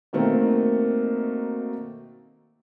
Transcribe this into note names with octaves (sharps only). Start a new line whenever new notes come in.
B2 D#3 A3 A#3 C4